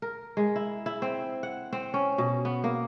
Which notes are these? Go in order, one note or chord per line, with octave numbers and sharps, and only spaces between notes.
A#4
G#3
E4
E4
C4
F#5
C4
C#4
B2
B3
A#3